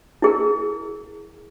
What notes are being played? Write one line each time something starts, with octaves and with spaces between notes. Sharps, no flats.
E4 G#4 A#4